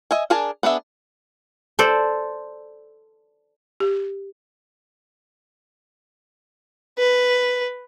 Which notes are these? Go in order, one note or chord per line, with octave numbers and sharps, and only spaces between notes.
D#5 E5 G#5
D4 G#4 A#4 G#5 A5
B3 D4 G#4 E5
A4 C5 D5
G4
B4